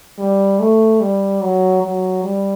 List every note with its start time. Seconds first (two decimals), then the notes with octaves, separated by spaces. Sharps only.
0.18 G3
0.60 A3
1.00 G3
1.42 F#3
1.83 F#3
2.24 G3